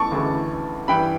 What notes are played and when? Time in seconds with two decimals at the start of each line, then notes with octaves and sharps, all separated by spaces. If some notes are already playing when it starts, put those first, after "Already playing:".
Already playing: E3 A5 C#6 D6
0.12 D2 C#3 E3
0.88 G2 E3 G5 B5